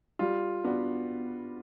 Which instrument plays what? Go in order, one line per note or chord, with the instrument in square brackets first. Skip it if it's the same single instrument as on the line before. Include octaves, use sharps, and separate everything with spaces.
[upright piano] G3 [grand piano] F4
[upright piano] B3 D4 F#4